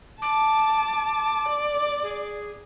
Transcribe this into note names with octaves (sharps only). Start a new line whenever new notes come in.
A5 D6
D5
G#4